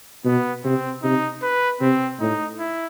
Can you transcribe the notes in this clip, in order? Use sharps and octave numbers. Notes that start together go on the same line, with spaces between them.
B2 B3
C3 C4
C3 D#4
B4
C3 C4
A2 D#4
E4